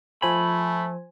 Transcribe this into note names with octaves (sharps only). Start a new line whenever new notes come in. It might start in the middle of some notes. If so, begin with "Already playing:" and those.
F3 A3 C5 G#5 B5